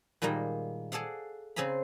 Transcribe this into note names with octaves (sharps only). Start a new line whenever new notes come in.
A#2 D#3 G3 G#3 A#3
G#4 A4 D5 F5 F#5
C#3 C4 G#4 A#5 B5